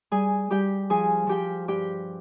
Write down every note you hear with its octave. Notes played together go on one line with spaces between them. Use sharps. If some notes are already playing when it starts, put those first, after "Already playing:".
G3 G#4 G#5
G3 G4 G5
F3 G#4 G#5
F3 G4 G5
G2 G4 G5